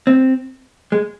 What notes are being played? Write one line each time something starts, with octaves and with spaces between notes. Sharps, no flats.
C4
G#3